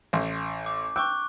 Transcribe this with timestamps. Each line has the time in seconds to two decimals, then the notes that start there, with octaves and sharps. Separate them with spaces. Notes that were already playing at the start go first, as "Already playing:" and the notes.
0.13 A1
0.66 D6
0.96 G5 C#6 D6 E6 F#6